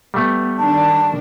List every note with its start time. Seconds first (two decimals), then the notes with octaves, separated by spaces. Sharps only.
0.14 G3 A3 B3
0.58 D#3 D4 A5